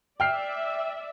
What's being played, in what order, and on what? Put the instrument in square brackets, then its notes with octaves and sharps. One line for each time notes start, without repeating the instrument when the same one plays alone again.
[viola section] D5 E5 [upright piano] G5 F6 C7